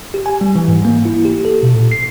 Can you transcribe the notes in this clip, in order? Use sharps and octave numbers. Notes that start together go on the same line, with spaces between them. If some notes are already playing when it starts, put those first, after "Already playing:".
G4
G#5
G3
E3
G#2
A#3
E4
G4
A4
B2
A#2
C7